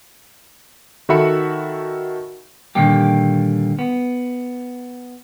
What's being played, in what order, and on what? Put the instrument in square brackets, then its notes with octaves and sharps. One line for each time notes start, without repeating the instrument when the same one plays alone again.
[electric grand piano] D#3 F#4 A4 E5 B5 C#7
[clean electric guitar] A#2 D3 D#3 G3 A#3 G4
B3